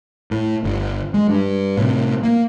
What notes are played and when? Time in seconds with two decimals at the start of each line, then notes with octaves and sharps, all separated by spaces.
0.31 A2
0.64 G1
1.14 G#3
1.29 G2
1.78 A2 C3
2.23 A#3